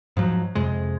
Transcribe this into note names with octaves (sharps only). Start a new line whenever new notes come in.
G#2 F3 F#3
F2 C3 G#3